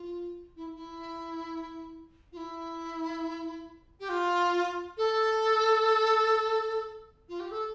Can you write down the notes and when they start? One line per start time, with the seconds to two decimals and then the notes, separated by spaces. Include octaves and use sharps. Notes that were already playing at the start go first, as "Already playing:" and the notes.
Already playing: F4
0.56 E4
0.75 E4
2.32 F4
2.36 E4
3.99 G4
4.08 F4
4.97 A4
7.28 F4
7.39 G4
7.51 A4